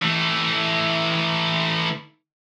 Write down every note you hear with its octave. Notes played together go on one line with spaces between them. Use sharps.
E3 A3